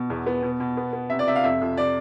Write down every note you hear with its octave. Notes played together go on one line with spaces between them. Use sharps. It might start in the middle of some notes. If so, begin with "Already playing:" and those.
Already playing: B2
E2
B3
B2
B2
B3
B3
C3 E5
D5
C3 E5
F5
F2 E5
F2
C3 D5